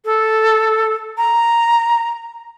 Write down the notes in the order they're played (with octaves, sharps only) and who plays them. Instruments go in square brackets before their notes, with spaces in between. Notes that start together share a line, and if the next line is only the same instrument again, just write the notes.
[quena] A4
A#5